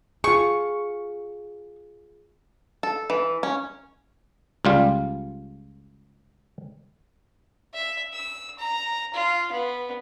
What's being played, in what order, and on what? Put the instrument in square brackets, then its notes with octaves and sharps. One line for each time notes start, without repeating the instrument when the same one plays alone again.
[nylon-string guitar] F4 G#4 [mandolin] C#6
[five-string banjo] A4
E3
C#4
[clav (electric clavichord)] C#2 G3 F4
[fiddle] E5
E6
A#5
F4
B3